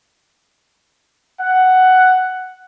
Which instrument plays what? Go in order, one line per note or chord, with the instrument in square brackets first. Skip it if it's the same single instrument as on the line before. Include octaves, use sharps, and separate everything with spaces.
[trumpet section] F#5